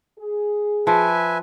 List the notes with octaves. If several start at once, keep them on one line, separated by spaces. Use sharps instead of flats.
G#4
F3 B4 E5 G#5